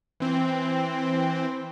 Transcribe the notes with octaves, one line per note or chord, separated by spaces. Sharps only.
E3 C4